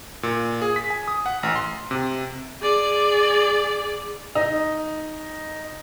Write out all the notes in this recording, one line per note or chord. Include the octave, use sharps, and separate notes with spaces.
A#2
G#4
B6
G#5
D#6
F#5
A1
C6
C3
G#4 D5
D#4